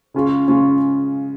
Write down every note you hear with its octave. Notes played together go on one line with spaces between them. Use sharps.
C#3 G#3 C#4 F4
C#3 G#3 C#4 F4